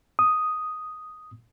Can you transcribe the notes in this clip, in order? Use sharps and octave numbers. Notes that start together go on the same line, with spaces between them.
D#6